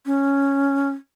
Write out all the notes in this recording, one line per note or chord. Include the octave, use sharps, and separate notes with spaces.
C#4